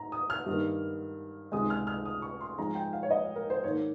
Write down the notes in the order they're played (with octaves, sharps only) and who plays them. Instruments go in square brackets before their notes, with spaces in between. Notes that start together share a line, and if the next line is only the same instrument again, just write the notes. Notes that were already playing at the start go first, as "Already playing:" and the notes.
Already playing: [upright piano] G#2 A#5
D#6
F6
G2 D#3 A#3
C#2 C3 D#3 G#3 D#6
F6
F6
D#6
C#6
C6
G#2 F3 G#3 A#5
G5
F5
C#5
D#5
A#4
C5
G#2 D#3 A#3 C#5